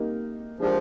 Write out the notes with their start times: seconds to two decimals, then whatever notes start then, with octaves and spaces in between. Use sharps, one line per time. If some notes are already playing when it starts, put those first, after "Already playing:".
Already playing: A#3 D#4 G4 A#4
0.59 F3 G#3 D4 G4 A#4